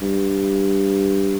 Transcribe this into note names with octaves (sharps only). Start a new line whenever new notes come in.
G2